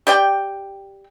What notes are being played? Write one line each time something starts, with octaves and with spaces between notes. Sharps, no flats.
G4 D5 G5